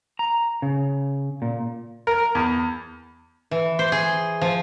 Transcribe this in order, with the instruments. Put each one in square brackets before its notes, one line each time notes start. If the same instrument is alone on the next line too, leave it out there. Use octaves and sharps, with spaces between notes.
[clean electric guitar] A#5
C#3
A#2
[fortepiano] A#4
E2
[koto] E3
C5
G#4
F3